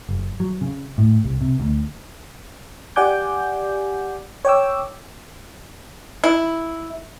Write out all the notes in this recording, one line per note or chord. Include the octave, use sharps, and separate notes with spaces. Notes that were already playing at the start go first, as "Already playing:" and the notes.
F#1
F#3
C#3
A2
C2
C3
D2
G4 D5 F#5 G#5 D6 G6
C#5 G5 D6 E6
E4